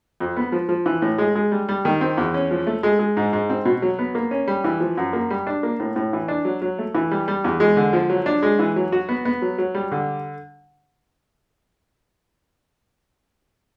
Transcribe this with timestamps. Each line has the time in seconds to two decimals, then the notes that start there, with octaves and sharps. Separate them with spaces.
0.20 F2
0.37 B3
0.52 F3
0.69 F3
0.86 E3
1.02 A2
1.18 G#3
1.35 G#3
1.52 G3
1.69 G3
1.85 D#3
2.01 C4
2.17 E2
2.34 C#4
2.51 F3
2.67 A3
2.83 G#3
2.99 G#3
3.17 G#2
3.33 G#2
3.50 C4
3.65 B2
3.82 F#3
3.99 B3
4.15 A#3
4.31 C#4
4.48 G3
4.64 E3
4.80 F3
4.97 F#2
5.13 A#3
5.30 G3
5.47 D4
5.63 A#3
5.80 A2
5.96 A2
6.13 E3
6.28 D4
6.45 F#3
6.62 F#3
6.79 A3
6.95 E3
7.11 G3
7.28 G3
7.44 E2
7.60 G#3
7.77 D3
7.93 F3
8.10 F#3
8.26 D4
8.43 G#3
8.59 E3
8.76 F#3
8.92 F#4
9.09 B3
9.25 B3
9.42 F#3
9.58 F#3
9.75 G3
9.92 D3